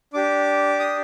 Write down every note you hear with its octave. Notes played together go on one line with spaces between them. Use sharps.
D4 G4 D6
D#6